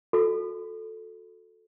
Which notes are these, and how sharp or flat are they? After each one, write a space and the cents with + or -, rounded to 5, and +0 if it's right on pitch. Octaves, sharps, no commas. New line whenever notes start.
F#4 -35 A4 +0